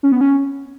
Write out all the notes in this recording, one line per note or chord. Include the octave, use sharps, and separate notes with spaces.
C#4
B3
C#4